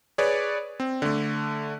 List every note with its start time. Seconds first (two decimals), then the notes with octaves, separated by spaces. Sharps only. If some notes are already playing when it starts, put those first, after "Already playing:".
0.18 G#4 B4 C#5 D5
0.80 C4
1.02 D3 A3